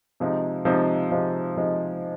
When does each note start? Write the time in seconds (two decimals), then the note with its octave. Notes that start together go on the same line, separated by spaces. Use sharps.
0.20 C3 F3 G#3 D#4
0.65 C3 F3 G#3 D#4
1.11 C3 F3 G#3 D#4
1.56 C3 F3 G#3 D#4